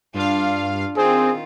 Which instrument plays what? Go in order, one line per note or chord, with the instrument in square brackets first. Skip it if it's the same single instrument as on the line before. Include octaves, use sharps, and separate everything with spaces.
[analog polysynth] G2 F5 [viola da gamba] D4 F4
[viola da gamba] D#3 F4 [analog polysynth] C4 [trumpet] G#4